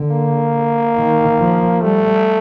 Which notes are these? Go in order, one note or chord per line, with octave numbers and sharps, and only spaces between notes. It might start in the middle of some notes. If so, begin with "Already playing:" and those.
Already playing: D3
A#3
D#3
F3
G3 A3